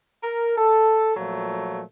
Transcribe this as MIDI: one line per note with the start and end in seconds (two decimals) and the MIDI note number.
0.23 0.54 70
0.58 1.13 69
1.16 1.83 46
1.16 1.83 53
1.16 1.83 54
1.16 1.83 57